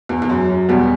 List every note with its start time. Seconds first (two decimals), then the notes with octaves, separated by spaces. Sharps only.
0.09 E2
0.22 E2
0.30 F#2
0.49 F#2
0.69 E2 B2 G3 B3